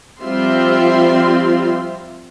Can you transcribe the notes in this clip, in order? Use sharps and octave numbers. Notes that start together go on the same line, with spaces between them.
F3 G3 C4 F4 E5 C6